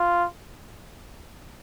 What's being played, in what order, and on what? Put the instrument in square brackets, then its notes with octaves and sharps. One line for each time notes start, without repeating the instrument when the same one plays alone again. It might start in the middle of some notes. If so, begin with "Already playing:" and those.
Already playing: [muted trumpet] F4